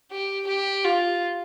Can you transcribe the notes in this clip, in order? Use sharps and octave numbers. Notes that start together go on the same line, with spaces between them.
G4
G4
F4